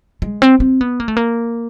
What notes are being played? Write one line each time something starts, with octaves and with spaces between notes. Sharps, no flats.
G#3
C4
C4
B3
A#3
A3
A#3